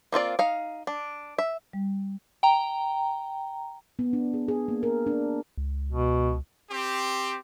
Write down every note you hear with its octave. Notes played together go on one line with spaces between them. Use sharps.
A#3 C4 F4 D5
D#4 F5
D4
E5
G3
G5 A#5
B3
D4
G#4
G#4
A#3
A#4
D4
C#2
B2
C4 G4